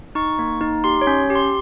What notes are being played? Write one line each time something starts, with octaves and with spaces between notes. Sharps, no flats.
D#4 C#6
A#3
D#4
G4 C6
C#5
C#4
G4
C6